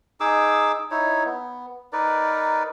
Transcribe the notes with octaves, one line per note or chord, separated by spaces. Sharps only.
D#4 G#4 D6 E6
D#4 E4 C#5
B3
D#4 A#4 B4 D5